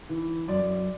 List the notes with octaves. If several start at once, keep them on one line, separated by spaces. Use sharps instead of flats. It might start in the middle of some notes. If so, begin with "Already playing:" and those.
E3
F#2 D5